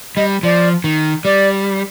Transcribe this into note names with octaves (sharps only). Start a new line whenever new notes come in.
G3 D#5
F3 D5
D#3
G3 D5